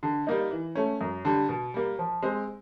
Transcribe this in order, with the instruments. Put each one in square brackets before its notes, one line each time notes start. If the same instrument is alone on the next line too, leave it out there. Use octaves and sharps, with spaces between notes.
[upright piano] D3
G3 A#3 D#4
E3
A3 C#4
F#2
D3 G3
B2
G3 A#3
F3
G#3 C4